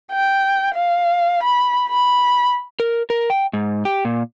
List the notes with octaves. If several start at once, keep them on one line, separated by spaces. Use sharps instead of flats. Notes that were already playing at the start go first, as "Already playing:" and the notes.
G5
F5
B5
B5
A#4
A#4
G5
G#2
G4
A#2